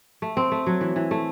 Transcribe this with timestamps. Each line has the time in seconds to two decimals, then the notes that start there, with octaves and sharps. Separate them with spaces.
0.22 A3
0.37 C4
0.52 A3
0.67 F#3
0.81 E3
0.96 E3
1.11 A3